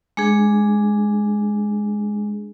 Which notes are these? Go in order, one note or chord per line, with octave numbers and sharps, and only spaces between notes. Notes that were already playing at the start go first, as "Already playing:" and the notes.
G#3 D4 G#4